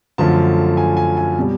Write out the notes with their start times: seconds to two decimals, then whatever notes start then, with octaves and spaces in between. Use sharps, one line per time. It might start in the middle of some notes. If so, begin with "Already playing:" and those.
0.18 F#2 D3 F3 A3 A5
0.77 G#5
0.97 G#5
1.17 G#5
1.39 B2 G3